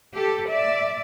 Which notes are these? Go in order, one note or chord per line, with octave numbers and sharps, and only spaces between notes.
G4 A4
D5 E5